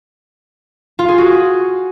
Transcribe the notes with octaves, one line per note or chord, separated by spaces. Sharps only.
F4
G#4
F#4